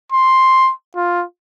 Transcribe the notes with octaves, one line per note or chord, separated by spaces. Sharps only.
C6
F4